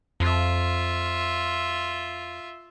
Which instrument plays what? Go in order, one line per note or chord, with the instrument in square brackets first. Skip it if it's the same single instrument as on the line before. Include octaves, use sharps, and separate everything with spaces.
[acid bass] F2 [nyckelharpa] F4 E5